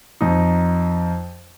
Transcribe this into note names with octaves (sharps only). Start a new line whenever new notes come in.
F2 D#4